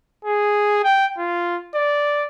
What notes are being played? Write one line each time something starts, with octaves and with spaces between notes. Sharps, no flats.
G#4
G5
F4
D5